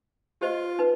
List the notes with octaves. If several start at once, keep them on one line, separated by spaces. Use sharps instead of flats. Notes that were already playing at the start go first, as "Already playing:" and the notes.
F4 G4 C5 D#5
D#4 B4